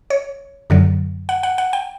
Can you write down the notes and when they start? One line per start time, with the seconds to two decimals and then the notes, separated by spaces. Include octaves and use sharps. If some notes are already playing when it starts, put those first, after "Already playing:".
0.10 C#5
0.70 F#2 D3 F#3
1.29 F#5
1.43 F#5
1.58 F#5
1.73 G5